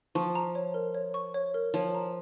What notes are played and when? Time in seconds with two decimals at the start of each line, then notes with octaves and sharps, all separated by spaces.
0.15 F3 C#6
0.35 A#5
0.55 C#5
0.74 A#4
0.94 C#5
1.14 C#6
1.34 C#5
1.54 A#4
1.74 F3 C#5
1.95 A#5